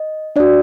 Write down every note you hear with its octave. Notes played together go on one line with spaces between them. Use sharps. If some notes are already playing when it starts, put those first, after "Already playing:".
Already playing: D#5
D4 F#4 D5